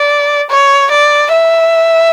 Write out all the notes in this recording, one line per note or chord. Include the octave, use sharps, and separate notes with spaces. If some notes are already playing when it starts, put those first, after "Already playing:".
Already playing: D5
C#5
D5
E5